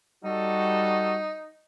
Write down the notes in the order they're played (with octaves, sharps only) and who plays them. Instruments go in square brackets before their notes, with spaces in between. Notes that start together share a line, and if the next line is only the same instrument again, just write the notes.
[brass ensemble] G3 F#4 A4 [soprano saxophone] D#4